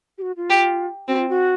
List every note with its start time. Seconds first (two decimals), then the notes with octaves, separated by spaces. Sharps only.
0.18 G4
0.22 F#4
0.37 F4
0.50 G4
1.08 C4 F#4
1.18 F4
1.29 F#4